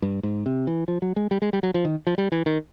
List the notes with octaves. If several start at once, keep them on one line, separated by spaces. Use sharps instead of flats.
G2
G#2
C3
E3
F3
F#3
G#3
G3
G#3
G3
F#3
F3
D#3
F3
G3
E3
D#3